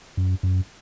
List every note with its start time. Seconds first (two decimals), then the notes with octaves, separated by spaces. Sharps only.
0.17 F#2
0.43 F#2